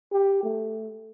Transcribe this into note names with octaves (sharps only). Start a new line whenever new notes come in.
G4
A3